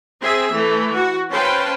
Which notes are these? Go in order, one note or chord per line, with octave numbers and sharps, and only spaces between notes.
C4 G#4 E5
E3 A3
F#4
C#4 B4 C5 F5 G5 A5